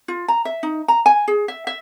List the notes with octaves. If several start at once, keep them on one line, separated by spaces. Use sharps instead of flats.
F4
A#5
E5
D#4
A#5
G#5
G#4
E5
E5